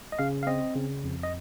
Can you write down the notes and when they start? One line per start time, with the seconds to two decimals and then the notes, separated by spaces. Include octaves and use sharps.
0.12 D#5
0.19 C#3 F5
0.43 F5
0.47 C4 D#5
0.75 C#3
1.04 F2
1.23 D#5